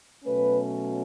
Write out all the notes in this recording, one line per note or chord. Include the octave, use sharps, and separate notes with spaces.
B2 F#3 A3 C#4 B4